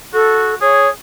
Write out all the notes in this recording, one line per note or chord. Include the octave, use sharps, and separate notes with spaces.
F#4 A4
G#4 C#5